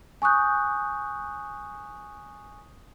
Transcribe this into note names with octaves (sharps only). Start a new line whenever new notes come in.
G#5 C#6 D#6 F#6 G6